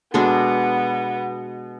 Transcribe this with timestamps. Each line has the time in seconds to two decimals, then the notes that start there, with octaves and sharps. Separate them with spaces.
0.14 B2 G#3 B3 D4 A4